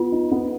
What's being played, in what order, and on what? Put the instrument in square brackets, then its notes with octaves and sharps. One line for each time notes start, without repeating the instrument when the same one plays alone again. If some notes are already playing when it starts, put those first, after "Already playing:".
Already playing: [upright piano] B3 [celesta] F4
[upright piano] D#4
B3